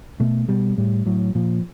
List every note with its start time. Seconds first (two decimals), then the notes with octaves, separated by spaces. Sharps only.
0.20 B2 A3
0.49 B2 G3
0.78 A2 G3
1.06 A2 F#3
1.35 A#2 F3